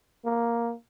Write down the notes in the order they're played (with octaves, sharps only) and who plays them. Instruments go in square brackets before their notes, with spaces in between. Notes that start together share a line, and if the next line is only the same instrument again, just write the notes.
[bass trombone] A#3